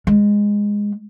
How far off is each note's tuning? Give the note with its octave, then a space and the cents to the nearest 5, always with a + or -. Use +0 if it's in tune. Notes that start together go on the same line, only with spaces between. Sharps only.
G#3 -10